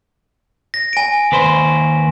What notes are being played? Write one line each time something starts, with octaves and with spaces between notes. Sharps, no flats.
A#6
G#5 D7
D#2 B4 C5